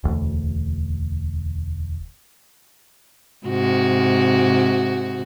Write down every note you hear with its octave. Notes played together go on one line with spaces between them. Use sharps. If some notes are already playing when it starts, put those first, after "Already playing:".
E1 D2
G#2 C3 F#4